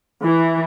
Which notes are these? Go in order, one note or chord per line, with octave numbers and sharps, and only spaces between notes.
E3